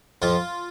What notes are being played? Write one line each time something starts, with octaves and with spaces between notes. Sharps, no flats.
F2 F4